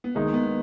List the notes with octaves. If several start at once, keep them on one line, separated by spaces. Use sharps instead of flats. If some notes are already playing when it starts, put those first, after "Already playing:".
B3
D#3 G#3 A#3 D#4
B3